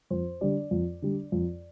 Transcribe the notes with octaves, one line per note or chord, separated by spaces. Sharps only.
F2 C5
D3 G3 D5
F2
D3 G3
F2